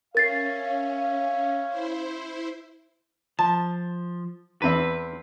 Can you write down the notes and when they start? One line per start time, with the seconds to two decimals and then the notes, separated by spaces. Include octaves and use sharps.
0.15 C#4 A#4 C#5 E5 F5 A6 C7
1.69 E4 C5
3.39 F3 A5
4.62 E2 C4 B4 E5